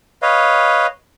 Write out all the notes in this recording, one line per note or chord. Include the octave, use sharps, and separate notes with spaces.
B4 C#5 D#5 F5